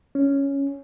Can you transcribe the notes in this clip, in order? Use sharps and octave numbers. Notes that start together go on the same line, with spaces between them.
C#4